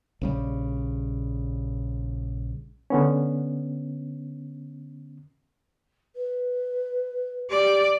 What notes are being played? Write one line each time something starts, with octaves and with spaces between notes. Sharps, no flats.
A#1 C#3 G3
D3 B3 C#4
B4
G4 D5